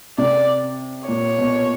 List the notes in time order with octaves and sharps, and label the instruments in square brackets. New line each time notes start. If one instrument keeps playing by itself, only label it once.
[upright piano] C3 [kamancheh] D5
[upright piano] A#2 [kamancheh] C#5
[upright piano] B2